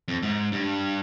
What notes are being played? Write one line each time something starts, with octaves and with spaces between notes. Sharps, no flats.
F2
G#2
G2